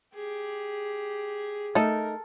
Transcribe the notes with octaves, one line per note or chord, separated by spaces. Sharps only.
G4 G#4
A3 D#4 A4 A#4